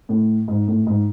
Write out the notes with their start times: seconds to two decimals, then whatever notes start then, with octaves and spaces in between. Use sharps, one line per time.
0.09 A2
0.48 G#2
0.68 A2
0.87 G#2